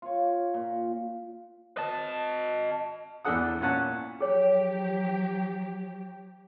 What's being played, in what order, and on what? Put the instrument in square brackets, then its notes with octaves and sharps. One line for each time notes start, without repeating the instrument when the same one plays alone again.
[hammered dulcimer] F4 C#5
A#2
[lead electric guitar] D#5 A5
[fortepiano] E2 E3 D4 A4 F#5 D#6
A#2 C#4 F#5 A5
[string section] F3 F#3 G4 [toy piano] G#4 C#5